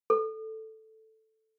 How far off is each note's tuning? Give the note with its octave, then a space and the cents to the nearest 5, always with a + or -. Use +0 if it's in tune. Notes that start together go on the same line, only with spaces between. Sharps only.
A4 +0